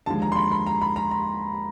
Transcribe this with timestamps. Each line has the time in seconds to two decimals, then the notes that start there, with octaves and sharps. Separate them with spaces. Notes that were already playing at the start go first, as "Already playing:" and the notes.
0.06 D#2 D3 F3 G#3 A5
0.22 A#5
0.32 C6
0.36 B5
0.52 B5
0.67 A#5
0.82 B5
0.96 A#5
1.11 A#5